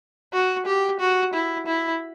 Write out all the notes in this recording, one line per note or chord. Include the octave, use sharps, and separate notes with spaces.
F#4
G4
F#4
E4
E4